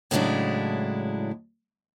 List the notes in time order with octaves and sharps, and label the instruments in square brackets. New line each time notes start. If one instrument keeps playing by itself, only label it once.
[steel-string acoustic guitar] A2 C#3 F#3 G#3 D4 E4